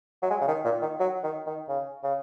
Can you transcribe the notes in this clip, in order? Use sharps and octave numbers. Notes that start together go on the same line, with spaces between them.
F#3
G#3
C#3
D#3
A#2
D#3
F#3
D#3
D#3
C#3
C#3